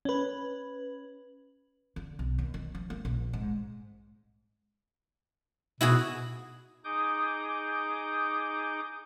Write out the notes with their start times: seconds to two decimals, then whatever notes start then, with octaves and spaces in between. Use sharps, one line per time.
0.05 C#4 B4
1.96 D3
2.19 B1
2.38 D#2
2.54 D#3
2.75 F3
2.90 A#3
3.05 A#1
3.33 G#2
5.81 B2 E4 F#4 G#4
6.84 D#4 G#4 D6 D#6 G6